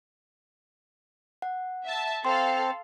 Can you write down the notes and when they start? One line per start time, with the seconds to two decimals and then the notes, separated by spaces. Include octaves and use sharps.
1.42 F#5
1.86 E5 A5
2.25 C4 A4 F5 C6